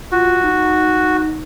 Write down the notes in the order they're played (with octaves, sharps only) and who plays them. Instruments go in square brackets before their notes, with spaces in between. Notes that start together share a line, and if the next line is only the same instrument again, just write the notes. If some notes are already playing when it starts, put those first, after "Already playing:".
[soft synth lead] F4 [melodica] F#4
[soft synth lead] D#4